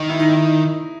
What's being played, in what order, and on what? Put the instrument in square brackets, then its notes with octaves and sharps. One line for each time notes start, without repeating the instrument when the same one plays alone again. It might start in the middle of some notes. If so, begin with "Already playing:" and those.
Already playing: [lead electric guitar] D#3
[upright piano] E4
D#4
E4